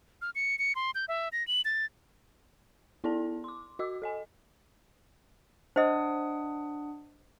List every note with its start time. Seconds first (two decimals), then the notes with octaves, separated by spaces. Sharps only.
0.22 F6
0.35 C#7
0.59 C#7
0.75 C6
0.95 G6
1.08 E5
1.32 A#6
1.48 F#7
1.65 A6
3.04 B3 E4 A4 D5 A5
3.44 C6 D6
3.79 F#4 D#5 D6 E6
4.02 A4 D#5 G#5
5.76 D4 C5 D#5 F#5 D#6